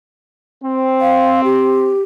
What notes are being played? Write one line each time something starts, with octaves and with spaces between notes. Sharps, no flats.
C4
F5
G4